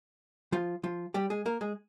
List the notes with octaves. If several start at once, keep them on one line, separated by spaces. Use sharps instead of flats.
F3 F4
F3 F4
G3 G4
G#3 G#4
A#3 A#4
G#3 G#4